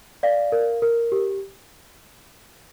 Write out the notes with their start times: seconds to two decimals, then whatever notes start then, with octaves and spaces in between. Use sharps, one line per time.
0.23 D5 F5
0.52 A#4
0.82 A#4
1.12 G4